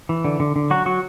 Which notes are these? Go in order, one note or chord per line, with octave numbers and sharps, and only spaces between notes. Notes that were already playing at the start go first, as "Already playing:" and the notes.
E3
D3
D3
D3
F#3 F#4
F#3 F#4